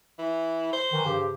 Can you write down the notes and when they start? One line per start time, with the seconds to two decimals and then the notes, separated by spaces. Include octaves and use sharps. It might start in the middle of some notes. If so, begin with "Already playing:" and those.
0.19 E3
0.73 C5
0.93 D#3 E3
1.06 G2 C#3 G4